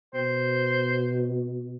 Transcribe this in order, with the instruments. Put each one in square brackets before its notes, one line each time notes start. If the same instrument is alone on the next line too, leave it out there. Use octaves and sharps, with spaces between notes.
[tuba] B2 [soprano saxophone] C5